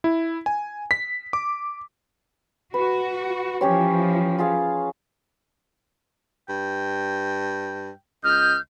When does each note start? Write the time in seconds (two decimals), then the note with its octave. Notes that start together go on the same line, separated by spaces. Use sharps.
0.04 E4
0.46 G#5
0.91 B6
1.33 D6
2.74 F#4 B4
3.61 E3 F3 C#4 G4 C#5
4.38 F4 G#4 F5
6.49 G2 G5
8.24 C#2 D#5 F6 G6